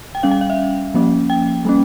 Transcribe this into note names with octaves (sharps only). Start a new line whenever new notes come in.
G5
G3 C#4 F5
G5
F5
E5
F3 A#3 C#4
G5
G3 A#3 C#4